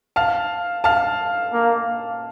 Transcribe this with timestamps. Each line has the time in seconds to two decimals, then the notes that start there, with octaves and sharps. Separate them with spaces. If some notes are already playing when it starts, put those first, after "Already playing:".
0.16 F5 A5
0.84 F5 A5
1.53 A#3